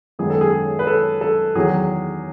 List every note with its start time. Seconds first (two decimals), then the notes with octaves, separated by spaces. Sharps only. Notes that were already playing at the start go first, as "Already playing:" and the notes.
0.19 F#2 D#3 G#3 B3 G#4
0.30 A4
0.41 G#4
0.79 B4
0.87 A4
1.21 A4
1.55 E2 D#3 F#3 G#4